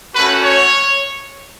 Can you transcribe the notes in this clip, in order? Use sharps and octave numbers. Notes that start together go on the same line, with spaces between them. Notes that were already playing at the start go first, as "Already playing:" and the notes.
A3 C#4 F#4 B4
C#5